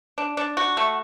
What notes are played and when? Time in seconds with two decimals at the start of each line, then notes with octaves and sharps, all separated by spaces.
0.18 D4
0.37 D4
0.57 F#4
0.77 A3